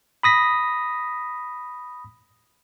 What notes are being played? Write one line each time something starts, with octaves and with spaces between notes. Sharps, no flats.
B5 D#6 A#6 B6